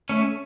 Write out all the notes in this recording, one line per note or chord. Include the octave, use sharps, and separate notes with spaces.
A3 C#4